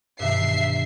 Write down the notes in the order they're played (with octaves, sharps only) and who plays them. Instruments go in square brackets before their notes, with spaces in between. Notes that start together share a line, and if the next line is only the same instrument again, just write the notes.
[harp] G2 B2 D#3 [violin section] E5 C7